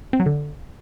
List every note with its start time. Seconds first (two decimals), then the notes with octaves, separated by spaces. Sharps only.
0.13 C4
0.20 F#3
0.26 D3